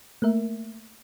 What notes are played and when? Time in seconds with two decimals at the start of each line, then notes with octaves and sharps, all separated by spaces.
0.22 A3 A#3 A#4 E5